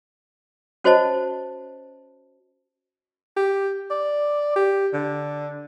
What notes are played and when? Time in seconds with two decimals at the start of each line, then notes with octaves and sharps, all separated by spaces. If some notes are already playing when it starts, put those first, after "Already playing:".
0.84 C#4 F#4 C5 C#5 D#5 A5
3.37 G4
3.90 D5
4.56 G4
4.93 D3